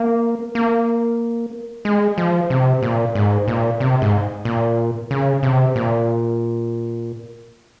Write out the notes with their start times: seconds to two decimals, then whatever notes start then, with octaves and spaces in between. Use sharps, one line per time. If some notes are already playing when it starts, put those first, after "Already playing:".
Already playing: A#3
0.55 A#3
1.85 G#3
2.18 F3
2.50 C3
2.82 A#2
3.15 G#2
3.48 A#2
3.80 C3
4.02 G#2
4.45 A#2
5.11 C#3
5.43 C3
5.76 A#2